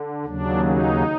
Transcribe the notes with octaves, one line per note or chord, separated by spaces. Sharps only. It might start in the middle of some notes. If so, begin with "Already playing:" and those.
Already playing: D3
D#2 C#3 F#3 D4
D#4